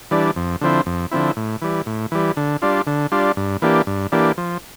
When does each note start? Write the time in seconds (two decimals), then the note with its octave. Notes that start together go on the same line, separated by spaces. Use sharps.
0.11 E3 G3 D4
0.36 F2
0.61 D3 F3 C4 E4
0.86 F2
1.11 D3 F3 C4 E4
1.37 A2
1.62 E3 G3
1.86 A2
2.12 E3 G3
2.37 D3
2.62 G3 D4 F4
2.87 D3
3.12 G3 D4 F4
3.37 G2
3.62 E3 A#3 D4 G4
3.87 G2
4.12 E3 A#3 D4 G4
4.38 F3